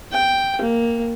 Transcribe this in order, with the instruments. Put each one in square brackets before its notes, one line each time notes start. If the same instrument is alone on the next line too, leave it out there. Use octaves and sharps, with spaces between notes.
[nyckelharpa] G5
A#3